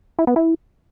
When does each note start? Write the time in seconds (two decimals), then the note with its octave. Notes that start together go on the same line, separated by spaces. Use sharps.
0.19 E4
0.27 B3
0.36 E4